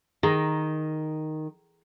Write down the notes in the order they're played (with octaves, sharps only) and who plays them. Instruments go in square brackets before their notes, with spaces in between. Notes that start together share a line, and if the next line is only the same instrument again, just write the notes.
[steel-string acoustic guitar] D#3 [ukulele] G#4 A#4